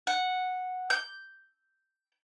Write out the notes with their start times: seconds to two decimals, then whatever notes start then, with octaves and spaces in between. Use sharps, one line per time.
0.07 F#5
0.90 G6